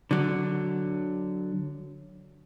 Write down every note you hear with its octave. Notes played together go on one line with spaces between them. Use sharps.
D3 F#3